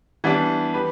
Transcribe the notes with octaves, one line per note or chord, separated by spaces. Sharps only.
E3 G3 B3 D4
G4 B4